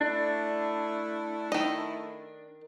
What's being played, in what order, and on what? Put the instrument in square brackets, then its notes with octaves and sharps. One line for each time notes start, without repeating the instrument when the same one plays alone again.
[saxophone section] A3 E4 [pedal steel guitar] D4
[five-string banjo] D#3 D#5